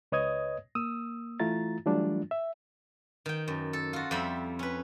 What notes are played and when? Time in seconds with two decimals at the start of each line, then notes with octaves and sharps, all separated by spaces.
0.12 C#2 B4 C#5 D#5 D#6 G#6
0.75 A#3 D#6 E6
1.40 E3 A3 E4 F4 A#5 A6
1.86 E3 F#3 G3 A3 D4 F4
2.31 E5
3.26 D#3 G5
3.48 F#2
3.73 A4
3.93 F4 F#4
4.11 F2 G3 C4 C5 E5 B5
4.59 C#4 B4